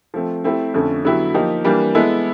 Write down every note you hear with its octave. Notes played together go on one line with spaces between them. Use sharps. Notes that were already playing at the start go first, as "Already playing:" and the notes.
F3 A3 C4
A3 C4 E4 G4
F2 D3 F3 A3 C#4
D3 F#3 B3 E4 G4
F3 A#3 D#4 G4
E3 G3 A#3 D4
G#3 B3 E4 A4